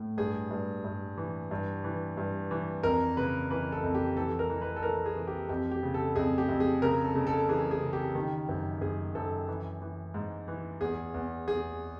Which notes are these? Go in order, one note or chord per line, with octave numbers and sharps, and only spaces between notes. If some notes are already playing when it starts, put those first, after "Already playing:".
Already playing: A2
G2 G#4
G2
G2
E3
G2
E3
G2
E3
F2 A#4
C#3 B4
E3 B4
A4
F2
G4
E3 A4
A#4
E3
B4
A4
E3 A#4
G#4
E3
G4
F2 G4
G4
C#3
A4
F2 G#4
G4
F2
G#4
C#3 A#4
A4
C#3
A4
E3 G#4
G#4
C#3
G4
D#3
F#2
F#2 G#4
F#2 A4
E3
E3
G#2
E3
E2 G#4
E2
E2 G#4